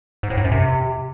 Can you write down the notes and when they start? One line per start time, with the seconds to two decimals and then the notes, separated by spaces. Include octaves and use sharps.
0.23 G#2
0.30 A2
0.37 G#2
0.44 F#2
0.52 C3